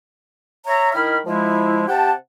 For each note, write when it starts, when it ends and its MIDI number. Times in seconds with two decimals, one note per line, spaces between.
0.67 0.93 73
0.67 0.93 76
0.67 0.93 82
0.94 1.18 51
0.94 1.18 64
0.94 1.18 70
0.94 1.18 75
0.94 1.18 83
0.94 1.18 89
1.26 1.86 53
1.26 1.86 56
1.26 1.86 64
1.88 2.11 48
1.88 2.11 67
1.88 2.11 78
1.88 2.11 79
1.88 2.11 81